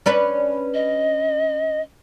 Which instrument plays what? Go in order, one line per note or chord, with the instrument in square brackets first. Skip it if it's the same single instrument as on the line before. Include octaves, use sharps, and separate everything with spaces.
[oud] C#4 D4 B4
[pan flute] D#5